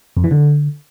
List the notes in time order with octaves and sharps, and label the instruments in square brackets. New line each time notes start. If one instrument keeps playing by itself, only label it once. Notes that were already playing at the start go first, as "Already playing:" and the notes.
[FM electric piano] F2
E3
D3